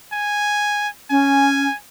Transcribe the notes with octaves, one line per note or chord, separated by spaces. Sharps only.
G#5
C#4 G#5